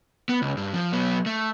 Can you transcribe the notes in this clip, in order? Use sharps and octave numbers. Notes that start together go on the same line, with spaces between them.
B3
C#2
G2
F3
F#3 B3
A3